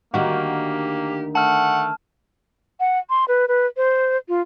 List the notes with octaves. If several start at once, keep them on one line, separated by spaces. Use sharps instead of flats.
D2 D#3 A#3 F#4 G4
A3 F#5 A5 F6
F#5
C6
B4
B4
C5
F4